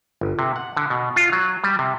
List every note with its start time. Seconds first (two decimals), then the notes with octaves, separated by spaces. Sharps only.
0.21 G1
0.39 C3
0.56 F#5
0.77 D3
0.90 B2
1.16 F4
1.32 F#3
1.64 G3
1.79 C3